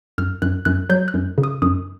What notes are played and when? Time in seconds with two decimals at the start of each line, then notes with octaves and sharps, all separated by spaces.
0.18 F#2 F6
0.42 F#2 F#6
0.65 F#2 F#6
0.90 F#3 G6
1.08 F#6
1.14 F#2
1.38 C#3
1.43 D#6
1.62 F#2 D#6